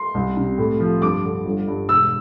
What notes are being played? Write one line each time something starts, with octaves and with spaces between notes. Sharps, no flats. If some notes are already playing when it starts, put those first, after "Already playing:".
Already playing: C6
C2
C3
A2
F3
G2 D6
D3
G1
G2
E1 E6